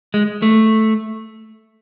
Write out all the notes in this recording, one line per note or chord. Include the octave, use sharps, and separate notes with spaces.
G#3
A3